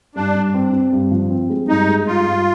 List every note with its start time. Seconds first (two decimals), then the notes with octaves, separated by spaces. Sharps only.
0.15 G2 D4
0.35 G2
0.54 C4
0.72 C4
0.93 G2
1.11 F3
1.30 C4
1.50 G#3
1.68 G2 D#4
1.87 G#3
2.06 G2 F4
2.26 G2